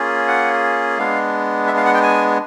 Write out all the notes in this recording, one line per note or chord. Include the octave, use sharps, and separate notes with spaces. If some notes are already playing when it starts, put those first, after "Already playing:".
Already playing: A#3 C#4 F4 G#4
F#5
G#3 B3 D4 F5
E5
F5
F#5
G5
G#5